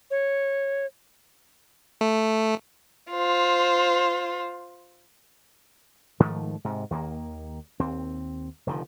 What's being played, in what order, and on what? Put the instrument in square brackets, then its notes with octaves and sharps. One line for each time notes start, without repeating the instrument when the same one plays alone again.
[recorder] C#5
[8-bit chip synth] A3
[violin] F4 C5
[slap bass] G#2 D#3 F3 A3
G#2 C3
D#2 D#3 E3 A#3
D#2 C4
F1 D3 D#3 F3